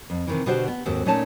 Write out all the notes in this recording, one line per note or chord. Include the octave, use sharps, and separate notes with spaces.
F2
C3 D#3 E3
B2 D3 F#4 G4 C5 D5
B3
D#2 G#2 C4 F#4 A4
A#2 A3 C#4 D#4 C#5 A5